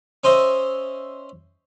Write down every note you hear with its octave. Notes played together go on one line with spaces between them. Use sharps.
C#4 C5 D#5 E5